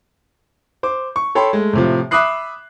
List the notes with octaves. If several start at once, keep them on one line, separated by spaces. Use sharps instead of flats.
C5 D6
C#6
A4 C#5 G5 B5 C6
G#3 A3
A2 C3 F3
E5 B5 D6 D#6 F#6 C7